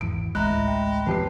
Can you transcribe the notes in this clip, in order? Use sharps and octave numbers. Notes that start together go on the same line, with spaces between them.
G#1 E2 D7
A1 D2 A2 G#3 E5 A#5 B5 F#6
G5 B5
F1 G4 B4 A5 C7